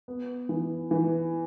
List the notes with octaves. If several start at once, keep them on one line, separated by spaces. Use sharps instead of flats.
B3
E3
E3